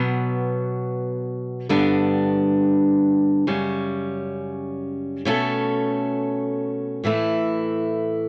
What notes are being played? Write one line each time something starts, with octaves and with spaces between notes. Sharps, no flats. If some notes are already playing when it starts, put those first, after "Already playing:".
Already playing: B2 F#3 B3
G2 D3 G3 B3 D4
F#2 C#3 G3 C#4
B2 A3 C#4 E4 A4
A2 E3 A3 E4